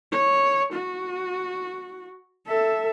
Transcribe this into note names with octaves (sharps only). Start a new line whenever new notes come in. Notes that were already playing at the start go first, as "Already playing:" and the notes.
C#5
F#4
A4 E5